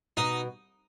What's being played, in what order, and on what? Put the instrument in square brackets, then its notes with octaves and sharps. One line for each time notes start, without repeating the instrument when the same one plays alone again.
[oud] B2 [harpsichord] D#4